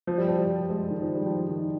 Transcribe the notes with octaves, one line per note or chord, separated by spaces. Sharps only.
F3
G3
F3
G3
G#3
D#3
F3
G3
F3
D#3